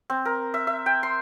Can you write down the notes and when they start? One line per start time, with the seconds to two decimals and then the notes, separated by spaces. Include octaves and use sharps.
0.10 C4
0.25 A#4
0.54 E5
0.67 E5
0.86 G5
1.03 C6